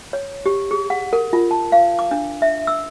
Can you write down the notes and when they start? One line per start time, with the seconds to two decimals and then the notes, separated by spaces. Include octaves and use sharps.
0.13 C#5
0.46 G4
0.71 G#4
0.90 F#5
1.13 A#4
1.33 F4
1.51 A5
1.72 F5
1.99 D6
2.11 D4
2.42 E5
2.67 E6